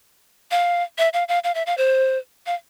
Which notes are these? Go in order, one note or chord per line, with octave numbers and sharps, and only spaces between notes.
F5
E5
F5
F5
F5
E5
F5
C5
F5